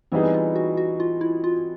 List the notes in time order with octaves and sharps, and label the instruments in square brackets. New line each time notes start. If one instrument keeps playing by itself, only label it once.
[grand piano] E3 G3 B3 D#4 G#4 [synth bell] C4
[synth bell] F4
F#4
F#4
F4
E4
F4